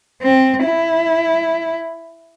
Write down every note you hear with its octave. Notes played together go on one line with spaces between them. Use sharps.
C4
E4